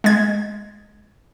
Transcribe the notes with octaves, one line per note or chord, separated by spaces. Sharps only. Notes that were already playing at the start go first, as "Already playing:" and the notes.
G#3 G#6